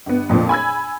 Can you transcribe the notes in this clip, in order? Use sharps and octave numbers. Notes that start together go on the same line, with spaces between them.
G1 B3
F2 A#2 D3 F3
G#5 B5 E6 G#6